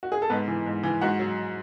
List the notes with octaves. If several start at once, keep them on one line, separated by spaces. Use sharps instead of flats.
F#4
G#4
A4
G#2 B3 B4
E3
G#2
E3
G#2 F#4 F#5
F#3